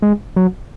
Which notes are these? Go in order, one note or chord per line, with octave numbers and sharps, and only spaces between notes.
G#3
F#3